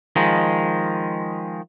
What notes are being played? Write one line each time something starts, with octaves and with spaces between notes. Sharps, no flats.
D#3 F3 G#3